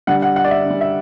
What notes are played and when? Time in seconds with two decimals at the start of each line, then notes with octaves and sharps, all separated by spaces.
0.07 D3 G3 F#5
0.22 F#5
0.36 F#5
0.45 D5
0.51 E5
0.65 D3 G3
0.81 E5